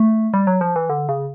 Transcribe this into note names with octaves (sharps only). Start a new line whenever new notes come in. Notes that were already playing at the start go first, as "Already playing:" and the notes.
Already playing: A3
G3
F#3
F3
E3
D3
C#3